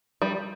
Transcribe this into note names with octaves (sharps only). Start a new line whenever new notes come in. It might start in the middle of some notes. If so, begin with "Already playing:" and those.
G3